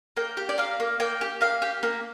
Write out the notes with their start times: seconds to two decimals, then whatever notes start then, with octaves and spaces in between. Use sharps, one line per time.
0.17 A#3 G5
0.37 G4
0.49 D5
0.58 A#3 F5
0.80 A#3
1.00 A#3 G5
1.21 G4
1.41 A#3 F5
1.62 G4
1.83 A#3